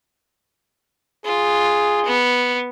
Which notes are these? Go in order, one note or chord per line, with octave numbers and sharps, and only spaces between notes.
F4 G#4
B3